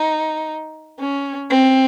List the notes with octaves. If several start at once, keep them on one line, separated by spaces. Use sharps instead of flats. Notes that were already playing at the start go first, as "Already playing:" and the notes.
Already playing: D#4
C#4
C4